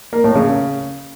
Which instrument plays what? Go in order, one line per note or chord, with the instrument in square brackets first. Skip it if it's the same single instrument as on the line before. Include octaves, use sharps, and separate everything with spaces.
[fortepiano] A#3
A2
C#3